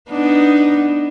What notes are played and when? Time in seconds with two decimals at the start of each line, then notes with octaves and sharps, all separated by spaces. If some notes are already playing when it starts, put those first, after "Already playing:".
0.11 B3 D4 D#4